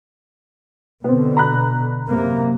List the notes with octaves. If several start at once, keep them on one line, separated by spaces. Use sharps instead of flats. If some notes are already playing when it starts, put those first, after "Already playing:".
B2 D3 B3 C4
A#5 B5 F#6
F#2 C3 A#3